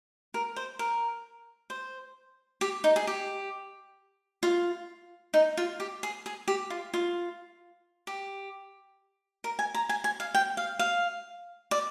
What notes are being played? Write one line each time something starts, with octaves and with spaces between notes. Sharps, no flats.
A#4
C5
A#4
C5
G4
D#4
G#4
G4
F4
D#4
F4
G4
G#4
G#4
G4
F4
F4
G4
A#4
G#5
A#5
G#5
G#5
F5
G5
F5
F5
D5